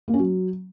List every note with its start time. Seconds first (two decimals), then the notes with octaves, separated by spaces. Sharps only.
0.08 A#3
0.14 C#4
0.19 F#3